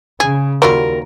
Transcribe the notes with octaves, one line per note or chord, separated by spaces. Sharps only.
C#3 G#4
D#2 F#3 G3 F4 A#4